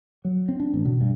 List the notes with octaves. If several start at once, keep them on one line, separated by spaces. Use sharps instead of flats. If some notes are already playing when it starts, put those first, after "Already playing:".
F#3
C4
D4
A1
B2
G2